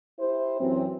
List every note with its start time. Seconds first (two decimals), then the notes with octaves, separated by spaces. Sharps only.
0.20 E4 G4 C5
0.60 F#2 E3 F#3 C4